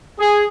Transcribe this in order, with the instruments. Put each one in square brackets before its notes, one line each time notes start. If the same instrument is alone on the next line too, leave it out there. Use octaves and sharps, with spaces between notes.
[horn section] G#4